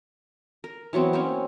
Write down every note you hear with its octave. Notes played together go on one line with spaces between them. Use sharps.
A#4
E3 F#3 B3 C4
A#3 C4 C#4